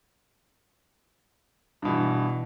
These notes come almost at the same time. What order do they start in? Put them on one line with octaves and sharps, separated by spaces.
G2 B2 E3